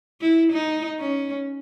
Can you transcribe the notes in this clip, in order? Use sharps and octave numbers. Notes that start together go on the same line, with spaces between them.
E4
D#4
C#4